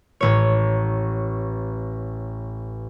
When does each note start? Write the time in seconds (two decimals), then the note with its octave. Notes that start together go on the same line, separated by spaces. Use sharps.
0.21 A1 C#5